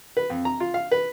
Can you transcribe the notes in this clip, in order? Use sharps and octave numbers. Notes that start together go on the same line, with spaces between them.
B4
F2
A#5
F4
F5
B4